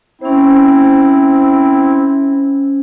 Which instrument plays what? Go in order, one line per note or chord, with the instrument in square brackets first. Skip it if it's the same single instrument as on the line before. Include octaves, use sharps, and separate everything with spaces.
[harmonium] C4 E4 [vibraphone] C#4 C5